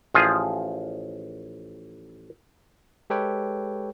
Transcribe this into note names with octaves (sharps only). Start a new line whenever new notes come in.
A1 F3 F4 G#4
G#3 G4 A4 B4 C#5 G5